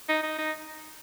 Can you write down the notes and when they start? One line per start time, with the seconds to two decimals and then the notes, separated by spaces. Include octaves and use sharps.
0.09 D#4
0.23 D#4
0.38 D#4